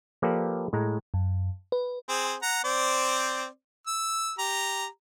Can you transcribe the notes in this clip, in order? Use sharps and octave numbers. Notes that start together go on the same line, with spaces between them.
F3 A#3 G4 A4 B4 D5
A2 G#3 A#5
F#2
B4
C4 G#4 C5
F#5 A#5
C4 C5 D5
E6
G4 A#5